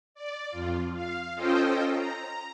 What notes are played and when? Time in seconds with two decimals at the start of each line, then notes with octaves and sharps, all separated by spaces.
0.15 D5
0.50 F2 F4
0.94 F5
1.35 C#4 F4 A4 C5 D#5 G5
1.92 A#5